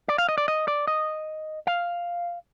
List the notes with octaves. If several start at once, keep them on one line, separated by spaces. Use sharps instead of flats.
D5
F5
D#5
D5
D#5
D5
D#5
F5